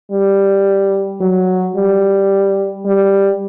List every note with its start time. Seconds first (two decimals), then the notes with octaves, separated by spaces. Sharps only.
0.12 G3
1.21 F#3
1.76 G3
2.86 G3